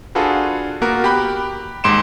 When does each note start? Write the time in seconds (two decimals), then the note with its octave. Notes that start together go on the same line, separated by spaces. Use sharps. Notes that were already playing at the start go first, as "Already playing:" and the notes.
0.15 D4 F4 F#4 G#4 A4 B4
0.82 A#3 B3 F#4 A#4
1.04 G4 B5 F#6
1.84 D#2 G#2 C6 D7 E7